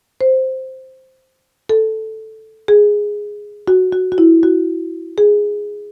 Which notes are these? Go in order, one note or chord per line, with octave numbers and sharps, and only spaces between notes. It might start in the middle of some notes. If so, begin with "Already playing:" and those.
C5
A4
G#4
F#4
F#4
F#4
E4
F#4
G#4